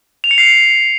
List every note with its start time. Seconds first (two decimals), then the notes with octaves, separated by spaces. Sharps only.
0.24 F7
0.31 C#7
0.38 C7